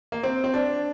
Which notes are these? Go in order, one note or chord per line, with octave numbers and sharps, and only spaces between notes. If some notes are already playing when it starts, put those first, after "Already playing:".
A#3
C4
C4
D4